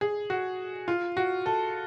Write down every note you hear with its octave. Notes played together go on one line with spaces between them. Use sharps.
G#4
F#4
F4
F#4
A4